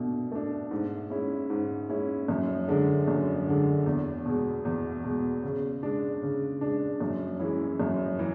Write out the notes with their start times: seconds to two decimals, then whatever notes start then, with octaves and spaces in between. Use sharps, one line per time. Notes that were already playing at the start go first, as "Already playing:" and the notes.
Already playing: B2 A3 D4
0.32 A3 D4
0.71 G#2
1.10 G#3 C#4 E4
1.50 G#2
1.89 G#3 C#4 E4
2.28 F#2
2.68 D3 G#3 D4
3.08 F#2
3.47 D3 G#3 D4
3.86 E2
4.25 B2 G#3
4.65 E2
5.04 B2 G#3
5.44 C#3
5.83 G#3 D4
6.22 C#3
6.61 G#3 D4
7.00 F#2
7.40 E3 G#3 C#4 E4
7.80 F#2
8.19 E3